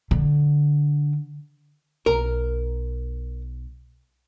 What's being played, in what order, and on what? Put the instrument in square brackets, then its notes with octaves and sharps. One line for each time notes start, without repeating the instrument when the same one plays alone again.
[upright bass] D3
[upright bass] B1 [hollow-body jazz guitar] A#4